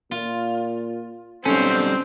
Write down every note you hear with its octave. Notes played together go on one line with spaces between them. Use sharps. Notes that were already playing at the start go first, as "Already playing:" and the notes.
A#2 F4
B1 G3 C4 C#4 A4